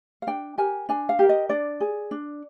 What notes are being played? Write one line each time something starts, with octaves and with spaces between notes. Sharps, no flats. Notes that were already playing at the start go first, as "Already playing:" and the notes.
F5
D4 G5
G4 A#4 G#5
D4 G#5
F5
G4 A#4
D#5
D4 D5
G#4
D4